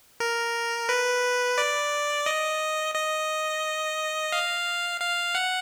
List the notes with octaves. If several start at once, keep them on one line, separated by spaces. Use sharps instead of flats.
A#4
B4
D5
D#5
D#5
F5
F5
F#5